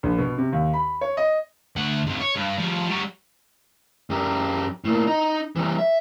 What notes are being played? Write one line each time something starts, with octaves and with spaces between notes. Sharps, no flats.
A#1
B2
C3
D#2
B5
C#5
D#5
D2 F#5
F2 G#2
C#5
G2
F3 G3
G3 F#4
F#2 G4
A2 A#3
D#4
E3 G3
E5